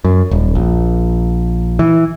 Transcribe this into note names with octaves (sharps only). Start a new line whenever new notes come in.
F#2
D#1
A#1
E3